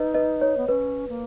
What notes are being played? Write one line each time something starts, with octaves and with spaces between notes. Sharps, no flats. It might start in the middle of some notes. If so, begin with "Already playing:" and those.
Already playing: D#4 B4 D#5
B4 D#5
C#5
B3
C#4 B4
A#3